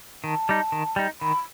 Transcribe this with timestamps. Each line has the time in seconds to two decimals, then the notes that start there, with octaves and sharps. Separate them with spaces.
0.24 D#3 A5
0.49 G3 D#4
0.72 D#3
0.96 G3 D#4
1.21 D#3 B5